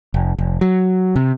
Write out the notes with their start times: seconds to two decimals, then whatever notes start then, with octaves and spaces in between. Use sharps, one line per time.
0.14 F1
0.39 F1
0.61 F#3
1.16 C3